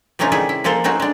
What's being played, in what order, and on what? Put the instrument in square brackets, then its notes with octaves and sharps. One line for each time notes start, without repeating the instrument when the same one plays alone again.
[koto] C3 E3 A3 C#4 D#4 F4
D#3 G3 E4 G#4
E4
F3 G#3 A#3 A4 C5
A3 C4 C#4 D#4 F#4
G#3 D4